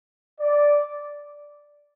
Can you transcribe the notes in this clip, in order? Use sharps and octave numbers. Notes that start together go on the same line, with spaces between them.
D5